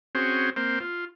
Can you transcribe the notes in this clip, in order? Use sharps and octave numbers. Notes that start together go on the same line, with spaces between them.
C4 C#4 F#4 G#4 C5
A#3 C4 C5
F4